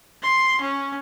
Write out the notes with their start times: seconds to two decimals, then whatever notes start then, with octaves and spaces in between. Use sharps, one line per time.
0.23 C6
0.61 C#4